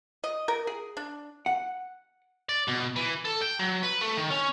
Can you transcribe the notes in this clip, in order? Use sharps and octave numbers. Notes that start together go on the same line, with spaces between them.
D#5
A#4
G#4
D4
F#5
D5
B2
E3
A4
G5
F#3
B4
A3
D#3
C#4